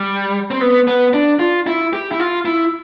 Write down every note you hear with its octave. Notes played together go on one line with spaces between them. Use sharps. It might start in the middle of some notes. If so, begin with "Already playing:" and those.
Already playing: G3
C4
B3
B3
D4
F4
E4
G4
E4
F4
E4